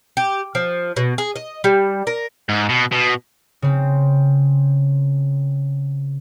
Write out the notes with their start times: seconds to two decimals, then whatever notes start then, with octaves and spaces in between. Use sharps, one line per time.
0.17 G4
0.55 F3
0.96 B2
1.18 G#4
1.36 D#5
1.64 G3
2.07 A#4
2.49 G#2
2.69 B2
2.92 B2
3.62 C#3 C4